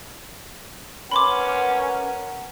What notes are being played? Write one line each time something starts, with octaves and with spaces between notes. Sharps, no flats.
C#4 A#4 B4 F#5 B5 C6 D6